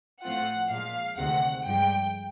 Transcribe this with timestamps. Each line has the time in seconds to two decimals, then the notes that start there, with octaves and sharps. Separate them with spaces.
0.23 A2 F3 A3 C4 F4 F#5
0.70 A#2 F3 G#3 F5
1.18 D2 C3 D#3 G#3 C4 F#5
1.66 G2 D3 F3 G#3 G5